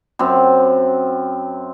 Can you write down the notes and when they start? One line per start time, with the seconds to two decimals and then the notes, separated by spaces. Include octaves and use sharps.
0.19 F#2 C4